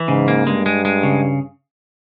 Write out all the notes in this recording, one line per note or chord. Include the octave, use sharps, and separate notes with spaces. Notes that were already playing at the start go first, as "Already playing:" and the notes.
Already playing: E3
G#2 C#3
A#3
G2 G#3
G#3
G#3
C#3